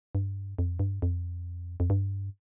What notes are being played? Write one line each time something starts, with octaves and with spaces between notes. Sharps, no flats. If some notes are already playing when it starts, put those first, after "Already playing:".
G2
F2
G2
F2
F2
G2